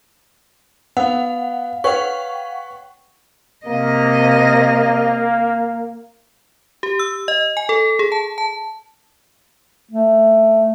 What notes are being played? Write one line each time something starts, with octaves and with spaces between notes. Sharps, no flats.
B3 F5 F#5
B4 C#5 F#5 G5 C#6
C3 A#3 D#5
G4
E6
D#5
G#5
A4
G#4
A5
A5
A3